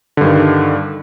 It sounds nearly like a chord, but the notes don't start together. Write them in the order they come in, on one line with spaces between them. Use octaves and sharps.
D3 G2 D#3